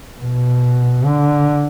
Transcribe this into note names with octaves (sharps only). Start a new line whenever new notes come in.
B2
D3